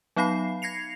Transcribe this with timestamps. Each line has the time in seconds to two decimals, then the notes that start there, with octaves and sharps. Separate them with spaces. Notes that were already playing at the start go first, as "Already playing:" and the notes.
0.16 F#3 B3 D#4 F5 B5 C7
0.62 G#6 A#6 C7 C#7 F7